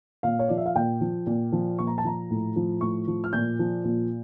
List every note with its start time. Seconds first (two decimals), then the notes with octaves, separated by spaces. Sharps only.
0.23 A#2 F5
0.39 C#5
0.48 F3 D5
0.57 E5
0.66 F5
0.76 A#2 G5
1.01 F3
1.27 A#2
1.52 F3
1.79 A#2 C#6
1.87 A#5
1.98 A5
2.04 F3 A#5
2.31 A2
2.56 F3
2.81 A2 C#6
3.07 F3
3.24 F6
3.33 A#2 G6
3.59 F3
3.85 A#2